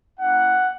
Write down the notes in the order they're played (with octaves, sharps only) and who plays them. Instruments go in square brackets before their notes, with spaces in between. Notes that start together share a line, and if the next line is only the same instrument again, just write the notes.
[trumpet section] A#3 C#4 E4 F#5